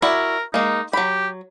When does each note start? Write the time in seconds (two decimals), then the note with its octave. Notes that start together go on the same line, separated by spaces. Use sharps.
0.02 E4 F#4 A#4 D5
0.54 G#3 A#3 D#4
0.93 F#3 G4 B5